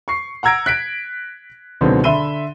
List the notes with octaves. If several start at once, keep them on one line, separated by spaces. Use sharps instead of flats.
C#6 C7
F#5 A#5 E6 G#6 A#6 D7
F#6 B6 D7
C#2 B2 D3 D#3 F#3 C4
D3 E5 B5 C6 D#7 G7